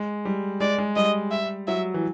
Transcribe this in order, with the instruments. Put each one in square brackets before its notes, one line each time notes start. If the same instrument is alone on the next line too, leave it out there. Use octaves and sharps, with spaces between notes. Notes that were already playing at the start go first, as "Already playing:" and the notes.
Already playing: [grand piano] G#3
G3
[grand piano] G#3 [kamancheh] D5
[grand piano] G#3
[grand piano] G3 [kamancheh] D#5
[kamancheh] E5
[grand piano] F#3 [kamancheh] E5
[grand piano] E3